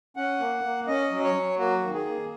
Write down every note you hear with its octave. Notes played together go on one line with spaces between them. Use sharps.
C#4 F#5
A#3
A#3
C#4 D#5
F#3
C#5
F#3
A#3 F#4
D#3
G#4
A#3